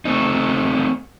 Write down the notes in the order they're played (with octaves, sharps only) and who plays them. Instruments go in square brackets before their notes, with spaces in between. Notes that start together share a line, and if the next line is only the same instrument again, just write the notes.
[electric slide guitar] A3 C4 D#4